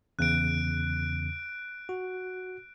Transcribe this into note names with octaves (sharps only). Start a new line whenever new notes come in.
E2 C#3 F#6 D7
F#4